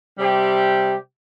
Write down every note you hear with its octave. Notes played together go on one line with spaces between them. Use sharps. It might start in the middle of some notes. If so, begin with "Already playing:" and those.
C3 G3 G4